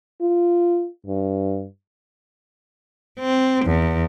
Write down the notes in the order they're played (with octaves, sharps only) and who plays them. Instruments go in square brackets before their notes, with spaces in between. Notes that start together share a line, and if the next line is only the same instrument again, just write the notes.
[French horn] F4
G2
[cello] C4
E2